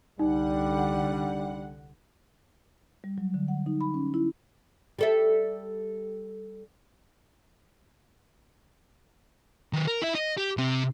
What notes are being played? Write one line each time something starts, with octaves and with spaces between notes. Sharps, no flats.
C2 D3 G3 D#4 F#5
G3
F#3
D3
F#5
D#4
B5
C#4
E4
G3 A4 E5
D#3 B4
A#4
E4 E5
D#5
G4
C3 C4